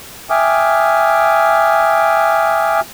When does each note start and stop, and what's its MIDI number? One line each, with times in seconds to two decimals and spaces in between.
0.30 2.80 76
0.30 2.80 79
0.30 2.80 80
0.30 2.80 86
0.30 2.80 87
0.30 2.80 89